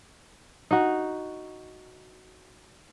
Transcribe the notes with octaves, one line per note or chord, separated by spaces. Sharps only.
D#4 F#4